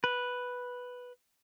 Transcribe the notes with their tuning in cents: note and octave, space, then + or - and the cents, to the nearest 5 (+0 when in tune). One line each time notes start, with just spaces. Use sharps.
B4 +0